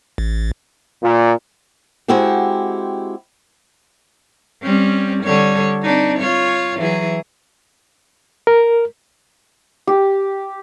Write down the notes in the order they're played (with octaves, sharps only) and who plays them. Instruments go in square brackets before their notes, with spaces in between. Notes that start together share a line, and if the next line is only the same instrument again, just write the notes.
[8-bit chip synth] A1
[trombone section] A#2
[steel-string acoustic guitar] G#3 C4 E4 F#4 G4
[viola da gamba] G3 C4 C#4
D3 G3 C#5
C4 D4 D#4
F4 C#5
E3 F#3 G#4
[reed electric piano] A#4
[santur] G4